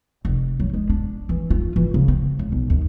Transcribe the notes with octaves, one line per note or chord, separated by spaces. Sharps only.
F1
F#3
G#3
D4
E3
F4
E3
C#3
C4
C#2
B1
D#2